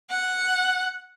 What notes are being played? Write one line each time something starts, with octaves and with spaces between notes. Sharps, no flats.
F#5